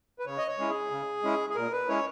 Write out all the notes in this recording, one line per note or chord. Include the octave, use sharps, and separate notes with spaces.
B4
C#3 C#5
D#5
C#5
G#3 C#4 E4
G#4
C#3
G#3 C#4 E4
G#4
A#2 A#4
B4
G#3 C#4 E4 C#5